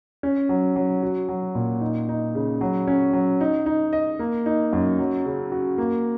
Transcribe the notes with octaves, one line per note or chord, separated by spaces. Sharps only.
C#4
F#3
F#3
F#4
F#3
A#2
D#4
D#4
C#3
F#3
C#4
F#3
D#4
D#4
D#5
A#3
D#4
F#2
F#3
C#3
F#4
A#3